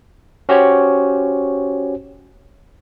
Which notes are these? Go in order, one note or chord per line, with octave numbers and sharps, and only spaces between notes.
C#4 F#4 G4 C5 C#5